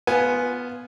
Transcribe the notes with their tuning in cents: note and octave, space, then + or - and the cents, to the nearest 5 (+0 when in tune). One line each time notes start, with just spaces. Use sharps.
B3 +0 F4 +0 G#5 +5